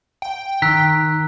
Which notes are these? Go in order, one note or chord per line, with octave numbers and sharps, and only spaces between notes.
G5
D#3 A#5 E6 F#6 B6